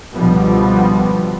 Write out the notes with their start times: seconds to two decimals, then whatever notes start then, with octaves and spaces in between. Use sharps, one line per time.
0.14 C#2 B2 D3 F3 G3 B3